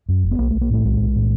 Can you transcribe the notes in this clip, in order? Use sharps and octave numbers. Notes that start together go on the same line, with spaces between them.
F#2
F#1
B3
B1 A#3
A3
B1
A#3
A2 A3
B1 G#3
B1
A2